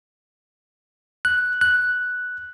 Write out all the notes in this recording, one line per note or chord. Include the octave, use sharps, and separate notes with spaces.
F#6
F#6